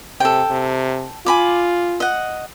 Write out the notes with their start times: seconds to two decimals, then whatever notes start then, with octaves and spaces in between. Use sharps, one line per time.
0.20 C3 A4 G5
0.51 C3
1.26 F4 G#5 B5 D6
2.00 D#5 F#5